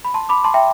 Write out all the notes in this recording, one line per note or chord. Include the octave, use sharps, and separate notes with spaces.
B5
A5 C6
B5 D6
A5 C6
E5 G5